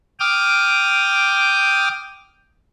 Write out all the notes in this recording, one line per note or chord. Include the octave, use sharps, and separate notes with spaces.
G5 D6 D#6 F6